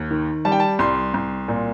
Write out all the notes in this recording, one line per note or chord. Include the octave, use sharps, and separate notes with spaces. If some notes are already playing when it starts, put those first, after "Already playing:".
Already playing: D#2
D#3
G3 A5
G5
A5
C2 C6
C2
A#2